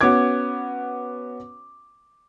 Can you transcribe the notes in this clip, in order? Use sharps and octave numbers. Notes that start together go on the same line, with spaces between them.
B3 C#4 F#4 D6 G#6